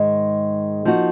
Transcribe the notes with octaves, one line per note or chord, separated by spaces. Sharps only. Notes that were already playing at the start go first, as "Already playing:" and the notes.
Already playing: G#2 D#3 G#3
F3 A#3 D#4 F#4